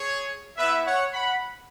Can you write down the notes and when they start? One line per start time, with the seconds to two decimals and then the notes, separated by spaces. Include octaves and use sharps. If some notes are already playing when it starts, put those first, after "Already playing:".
Already playing: G#4 C#5
0.57 B3 E4 B4 E5
0.85 C#5 F#5
1.13 F#5 B5